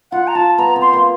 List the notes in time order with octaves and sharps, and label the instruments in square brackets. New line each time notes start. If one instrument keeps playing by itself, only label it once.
[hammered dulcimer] F4 [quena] F#5
[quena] A#5
[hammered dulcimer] F4 [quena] A5
[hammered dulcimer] B3 [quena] A#5
[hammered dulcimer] C4
[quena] C6
[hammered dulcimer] A#3